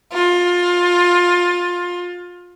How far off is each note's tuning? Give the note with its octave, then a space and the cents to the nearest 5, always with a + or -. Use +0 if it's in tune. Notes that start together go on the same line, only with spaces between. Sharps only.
F4 +20